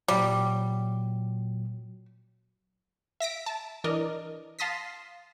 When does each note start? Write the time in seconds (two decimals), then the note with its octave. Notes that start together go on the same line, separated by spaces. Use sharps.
0.08 A#2 F#3 G3
3.20 E5 A#6 B6 D7
3.46 A5
3.84 E3 D4 A#4 D5 D#5
4.59 F5 A5 C6 D#6 A#6 B6